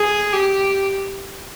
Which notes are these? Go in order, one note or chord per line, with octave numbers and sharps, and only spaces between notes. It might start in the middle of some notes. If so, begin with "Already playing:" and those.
Already playing: G#4
G4